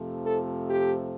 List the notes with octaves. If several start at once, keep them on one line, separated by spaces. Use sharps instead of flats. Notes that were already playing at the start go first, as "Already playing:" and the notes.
Already playing: F2 C3 F3 A3
A4
G4